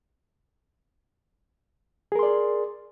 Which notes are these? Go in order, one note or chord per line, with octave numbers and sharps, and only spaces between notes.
G#4 A#4 D5 C6